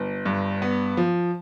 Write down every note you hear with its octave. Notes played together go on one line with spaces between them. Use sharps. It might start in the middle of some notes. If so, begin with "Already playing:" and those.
Already playing: G1
G2
B3
F3